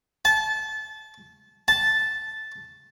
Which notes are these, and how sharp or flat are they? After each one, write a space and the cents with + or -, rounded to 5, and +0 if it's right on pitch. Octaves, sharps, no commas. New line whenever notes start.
A5 -25
A5 -5